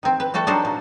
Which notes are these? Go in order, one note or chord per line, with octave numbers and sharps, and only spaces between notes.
D#3 C4
B4
G3 A3 F#4 A4
F#3 D4 D#4 F#4 A4 C5
A#2